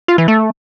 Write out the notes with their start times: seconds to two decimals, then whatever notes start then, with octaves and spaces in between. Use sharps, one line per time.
0.08 F4
0.18 E3
0.28 A3